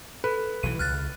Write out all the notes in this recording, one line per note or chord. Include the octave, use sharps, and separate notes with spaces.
A4 B4
B1 E3 D#7
C#2 F6 F#6 A6